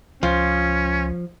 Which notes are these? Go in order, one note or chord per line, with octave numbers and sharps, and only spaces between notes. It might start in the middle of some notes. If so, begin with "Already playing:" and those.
C#2 F3 C#4 F4